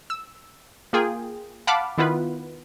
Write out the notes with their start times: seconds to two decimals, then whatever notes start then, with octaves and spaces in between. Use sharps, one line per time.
0.10 E6
0.93 A#3 F4 G#4 G5
1.67 F5 F#5 A5 B5 D6 F6
1.98 D#3 B3 E4 F4 B4